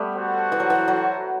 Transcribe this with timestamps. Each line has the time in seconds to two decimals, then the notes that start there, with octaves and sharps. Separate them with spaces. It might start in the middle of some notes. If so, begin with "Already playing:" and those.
Already playing: G3 A3 B3
0.15 F#4 A4 C5 F#5
0.52 E3
0.60 F#3
0.70 E3
0.88 F#3